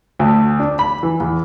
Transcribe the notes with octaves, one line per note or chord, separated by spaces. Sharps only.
D2
D4
B5
E3
E2